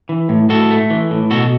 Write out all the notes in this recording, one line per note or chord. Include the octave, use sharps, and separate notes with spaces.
E3
A2
A2 F#4 A4
A3
E3
A2
B2 F#4 A4